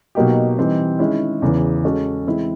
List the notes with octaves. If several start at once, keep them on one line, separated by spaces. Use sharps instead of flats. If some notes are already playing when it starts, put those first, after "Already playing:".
B2 F#3 A#3 D#4 G4
E3 G3 C4 D#4
D#3 G#3 C#4 E4
E2 C#3 E3
G#3 C#4 F#4 A4
E3 G#3 C4 E4